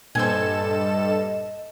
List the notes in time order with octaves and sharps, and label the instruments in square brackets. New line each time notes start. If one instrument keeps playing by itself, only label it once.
[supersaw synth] G2 A4 E7 [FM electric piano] A#2 [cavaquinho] C5 G#5 [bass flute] D#5